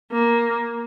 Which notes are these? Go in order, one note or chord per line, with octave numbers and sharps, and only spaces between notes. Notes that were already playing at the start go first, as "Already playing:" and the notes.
A#3